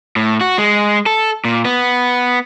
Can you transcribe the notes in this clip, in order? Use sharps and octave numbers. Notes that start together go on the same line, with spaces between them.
A2
F#4
G#3
A4
A#2
B3